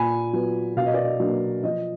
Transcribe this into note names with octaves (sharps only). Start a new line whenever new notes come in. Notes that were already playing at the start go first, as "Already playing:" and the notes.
Already playing: A#2 G#5 B5
F#3 B3
B2 F5
D#5
D5
D#5
F#3 A#3 D4
F3 D#5